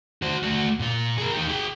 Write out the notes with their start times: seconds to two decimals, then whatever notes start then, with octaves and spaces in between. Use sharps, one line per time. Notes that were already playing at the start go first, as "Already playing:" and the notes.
0.22 F#4 C5
0.43 A3 F#4
0.79 A#2 F4
1.18 G#4 A#4
1.33 D#4 G4
1.49 G#4 G5